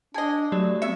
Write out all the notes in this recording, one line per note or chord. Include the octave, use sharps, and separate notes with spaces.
D4 G#4 D#5 A5 G#6
F#3 A3 G4 D5
B3 C4 E5 C#7